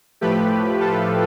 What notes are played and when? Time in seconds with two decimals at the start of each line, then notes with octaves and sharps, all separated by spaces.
0.21 A2 F3 A3 G4 B4
0.81 F4 A4